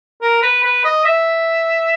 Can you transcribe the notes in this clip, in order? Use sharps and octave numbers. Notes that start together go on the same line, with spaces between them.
A#4
B4
B4
D#5
E5